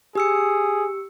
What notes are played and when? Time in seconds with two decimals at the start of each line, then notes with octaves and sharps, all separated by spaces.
0.15 G4 G#4 E6 C#7